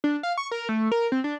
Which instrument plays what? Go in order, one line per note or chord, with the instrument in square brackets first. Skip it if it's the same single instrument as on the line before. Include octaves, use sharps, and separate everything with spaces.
[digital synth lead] D4
F5
C#6
A#4
A3
A#4
C4
D4